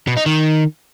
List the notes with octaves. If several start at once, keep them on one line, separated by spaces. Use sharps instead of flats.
B2
D#4
D#3